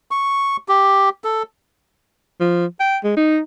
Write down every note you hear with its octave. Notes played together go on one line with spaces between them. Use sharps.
C#6
G4
A4
F3
G5
G#3
D#4